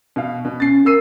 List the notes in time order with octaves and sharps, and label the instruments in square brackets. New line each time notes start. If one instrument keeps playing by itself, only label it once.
[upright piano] B2 F5
B2
[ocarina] C#4 [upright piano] A6 C7
[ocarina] A#4 [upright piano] E6 C7 D#7